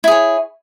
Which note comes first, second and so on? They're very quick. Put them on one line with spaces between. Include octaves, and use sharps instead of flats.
E4 G#4 C#5